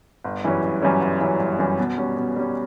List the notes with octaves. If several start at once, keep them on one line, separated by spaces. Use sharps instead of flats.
G1
F#2 E3 G3 C#4
G1
F#2 E3 G3 C#4
G1
F#2 E3 G3 C#4
G1
F#2 E3 G3 C#4
B2
G3 C#4
B2
G3 C#4